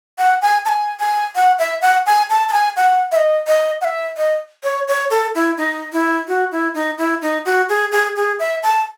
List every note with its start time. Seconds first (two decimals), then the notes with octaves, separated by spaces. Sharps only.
0.18 F#5
0.42 G#5
0.65 A5
0.69 G#5
1.00 G#5
1.35 F#5
1.59 E5
1.82 F#5
2.06 G#5
2.30 A5
2.48 A5
2.53 G#5
2.76 F#5
3.12 E5
3.16 D#5
3.47 D#5
3.81 F#5
3.84 E5
4.17 D#5
4.63 C#5
4.88 C#5
5.10 A4
5.35 E4
5.57 D#4
5.92 E4
6.28 F#4
6.52 E4
6.74 D#4
6.98 E4
7.22 D#4
7.45 F#4
7.69 G#4
7.92 G#4
8.16 G#4
8.39 E5
8.63 A5